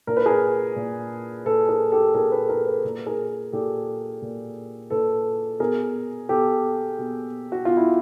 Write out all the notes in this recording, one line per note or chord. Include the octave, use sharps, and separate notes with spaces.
A#2 A#4
B4
G#4 A#4
A#2
A#2 A4 B4
G#4 A#4
G4 A4
A#2 G#4 A#4
A4 B4
G#4 A#4
A4 B4
A#2
G#4 A#4
A#2 G4 A4
A#2
A#2 A4 B4
B2 G#4 A#4
B2 G4 A4
B2
F#4
B2 F4
E4